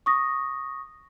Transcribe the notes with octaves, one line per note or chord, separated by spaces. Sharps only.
C#6 D#6 A#6